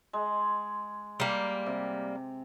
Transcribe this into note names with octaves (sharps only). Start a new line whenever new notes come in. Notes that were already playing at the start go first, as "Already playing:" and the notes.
G#3
G3 A#3
C3